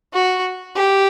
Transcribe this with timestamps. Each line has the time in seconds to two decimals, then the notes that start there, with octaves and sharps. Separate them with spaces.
0.14 F#4
0.76 G4